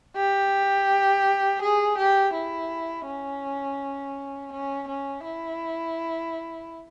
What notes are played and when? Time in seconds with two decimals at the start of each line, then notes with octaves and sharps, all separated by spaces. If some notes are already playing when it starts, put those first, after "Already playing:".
0.16 G4
1.62 G#4
1.98 G4
2.34 E4
3.06 C#4
4.52 C#4
4.88 C#4
5.25 E4